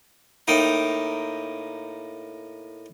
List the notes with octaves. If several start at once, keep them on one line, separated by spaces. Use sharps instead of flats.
A2 A#3 D#4 G5